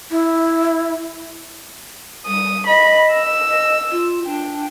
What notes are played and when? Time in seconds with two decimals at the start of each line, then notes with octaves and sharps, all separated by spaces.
0.11 E4
2.26 G3 D#6
2.67 D#5 B5
3.13 E6
3.48 D#5
3.91 F4
4.25 D4 G5